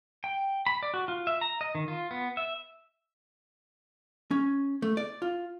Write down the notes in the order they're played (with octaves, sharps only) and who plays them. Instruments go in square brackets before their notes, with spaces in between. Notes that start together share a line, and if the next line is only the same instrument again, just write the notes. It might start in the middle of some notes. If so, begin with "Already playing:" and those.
[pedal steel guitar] G5
B5
D5
F#4
F4
E5
A#5
D#5
D#3
F4
B3
E5
[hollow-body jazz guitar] C#4
A3
D5
F4